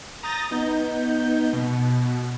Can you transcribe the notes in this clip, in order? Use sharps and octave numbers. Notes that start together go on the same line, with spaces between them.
A#5 D#6 G6 A6 A#6
B3 D#4 G6
B2